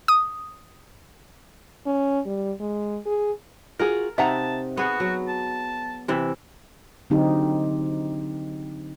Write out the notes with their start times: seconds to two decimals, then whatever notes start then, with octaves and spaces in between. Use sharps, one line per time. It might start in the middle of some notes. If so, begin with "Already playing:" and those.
0.08 D#6
1.86 C#4
2.26 G3
2.60 G#3
3.06 G#4
3.79 F4 F#4 G#4 A#4
4.18 C3 D#4 E5 F#5 A5 A#5
4.77 B3 F#4 G#4
5.00 F#3
5.28 A5
6.08 C3 E3 E5
7.10 D3 F#3 C4 D#4 G4